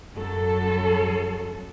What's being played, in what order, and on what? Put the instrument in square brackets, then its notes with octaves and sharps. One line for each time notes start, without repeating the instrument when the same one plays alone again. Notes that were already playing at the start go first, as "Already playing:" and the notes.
[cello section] F#2 F#3 A4